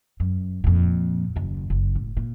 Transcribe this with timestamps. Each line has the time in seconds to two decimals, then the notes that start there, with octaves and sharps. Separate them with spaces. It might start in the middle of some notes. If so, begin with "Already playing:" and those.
0.20 F#2
0.64 F2 A#2
1.36 F#1 D#2
1.70 F#1
1.95 A2
2.17 A#2